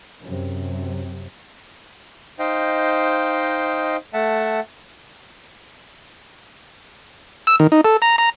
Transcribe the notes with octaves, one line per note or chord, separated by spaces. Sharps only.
F#2 C3
D#4 C5 D#5 F5 G5
A3 E5 F#5 A5
E6
D#3
D#4
A4
A#5
A#5